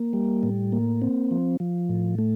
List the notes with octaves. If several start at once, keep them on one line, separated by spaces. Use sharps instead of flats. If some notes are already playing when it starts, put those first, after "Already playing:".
Already playing: A#3
G3
A2
A#3
C4
F3
F3
A2
A3